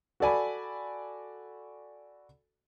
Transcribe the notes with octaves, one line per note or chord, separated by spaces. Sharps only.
F#4 A4 D5 G#5 B5